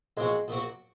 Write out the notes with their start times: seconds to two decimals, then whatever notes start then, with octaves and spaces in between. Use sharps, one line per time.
0.17 A#1 A#2 F#3 G#3 C4 F#4
0.48 A#1 A#2 F#3 C4 F#4